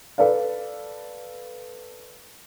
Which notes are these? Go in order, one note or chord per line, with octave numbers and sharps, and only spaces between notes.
A4 B4 D5 F5